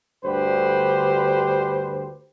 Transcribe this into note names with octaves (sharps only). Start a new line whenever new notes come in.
D2 G2 D3 G4 B4 C5